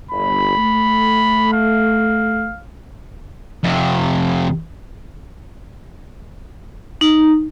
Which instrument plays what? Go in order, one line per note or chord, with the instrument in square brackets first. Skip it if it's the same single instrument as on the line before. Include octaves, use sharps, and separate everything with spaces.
[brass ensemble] G1 [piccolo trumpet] B5
[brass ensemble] A3
[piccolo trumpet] F5
[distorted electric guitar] F2 C3
[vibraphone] D#4